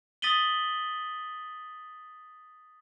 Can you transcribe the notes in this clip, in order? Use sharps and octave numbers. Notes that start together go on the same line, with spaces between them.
D#6 A6 B6 D#7 F#7 G7